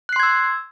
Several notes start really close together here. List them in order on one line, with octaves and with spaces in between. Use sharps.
F#6 C7 C6 G#6 E6